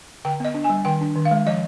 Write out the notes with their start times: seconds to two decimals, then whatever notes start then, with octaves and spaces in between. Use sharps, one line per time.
0.25 D3 G5
0.40 B3 D#5
0.54 D4
0.64 G#5
0.70 G3
0.85 D#3 G5
1.01 D4
1.16 D#3
1.25 F5
1.31 G#3
1.46 F3 D#5